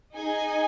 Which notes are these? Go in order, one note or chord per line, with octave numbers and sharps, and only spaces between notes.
D#4 G#4 D#5 G#5